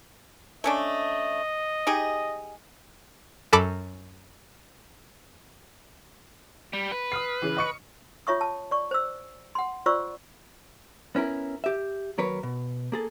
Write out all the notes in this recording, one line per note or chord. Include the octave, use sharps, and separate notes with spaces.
A3 C#4 D4 D#5
D#4 G4 G#4
F#2 A4 B5 D6
G3
B4
D#6 F6 C7
C#3 E3
D#5 C#6 C#7
F4 C#5 E5 C#6 D#6
A5
D5 C#6
C5 E6
F#5 C6
F4 C5 D5 C#6 E6
B3 C#4 E4 A#4
G4 E5
D#2 F#3 A#4 B4 C#5
B2
A#3 G#4 A4